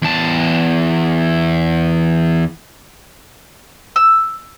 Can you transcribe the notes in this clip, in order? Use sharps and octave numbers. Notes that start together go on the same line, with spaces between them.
E2 A5
E6